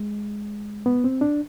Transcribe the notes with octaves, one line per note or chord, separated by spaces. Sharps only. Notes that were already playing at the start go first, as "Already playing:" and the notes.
Already playing: G#3
B3
C4
D4